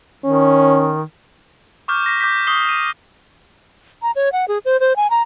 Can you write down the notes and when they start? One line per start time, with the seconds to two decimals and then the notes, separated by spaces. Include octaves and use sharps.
0.24 D#3 C#4
1.88 C#6 D6 F6 G6
2.06 A#6 B6
2.21 D6 G6 B6
2.47 C#6 D#6 C7 G7
2.69 D#7
4.02 A#5
4.16 C#5
4.32 F#5
4.48 G#4
4.65 C5
4.80 C5
4.96 G#5
5.10 A#5